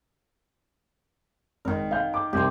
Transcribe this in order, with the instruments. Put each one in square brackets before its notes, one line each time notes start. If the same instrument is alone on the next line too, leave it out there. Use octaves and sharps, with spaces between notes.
[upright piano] G#1 [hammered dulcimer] D#3 A#4
[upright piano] F5 G6
D6
[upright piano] C2 [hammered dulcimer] G4 C5